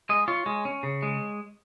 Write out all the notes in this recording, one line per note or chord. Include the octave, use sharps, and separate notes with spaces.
G#3 D#5
F4 C#5
G#3
C#4
C#3
G#3